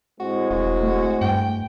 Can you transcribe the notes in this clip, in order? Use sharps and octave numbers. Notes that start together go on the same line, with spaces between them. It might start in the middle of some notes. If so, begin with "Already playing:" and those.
A2 G#3 C4 F#4
E1 F#4
A3
G2 G5